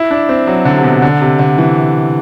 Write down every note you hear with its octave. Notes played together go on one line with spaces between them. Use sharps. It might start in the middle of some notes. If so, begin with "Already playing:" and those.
Already playing: E4
D4
C4
F#3
D3
C3
B2
D3
C3
D3
E3